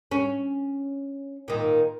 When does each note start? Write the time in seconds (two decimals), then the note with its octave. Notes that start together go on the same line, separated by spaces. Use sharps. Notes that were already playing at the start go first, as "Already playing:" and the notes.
0.11 C#4
1.48 A#2 D#3